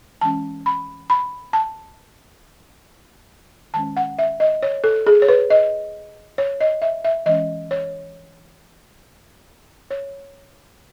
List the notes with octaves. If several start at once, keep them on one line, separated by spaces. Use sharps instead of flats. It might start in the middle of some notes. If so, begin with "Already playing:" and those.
E3 G#3 C#4 A5
B5
B5
A5
D#3 G#3 C#4 A5
F#5
E5
D#5
C#5
A4
G#4
C#5
B4
D#5
C#5
D#5
E5
E5
E3 G#3 C#4 D#5
C#5
C#5